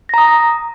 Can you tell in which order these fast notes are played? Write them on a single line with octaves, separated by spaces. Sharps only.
A#6 A#5 D#6